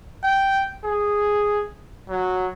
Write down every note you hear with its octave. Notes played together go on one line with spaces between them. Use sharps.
G5
G#4
F#3